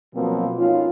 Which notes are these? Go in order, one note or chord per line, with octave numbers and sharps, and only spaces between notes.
B2 F3 F#3 A#3 C4
C#4 D#4 F4